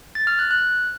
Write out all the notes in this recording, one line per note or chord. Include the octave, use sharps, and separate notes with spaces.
A6
F6
F#6
F#6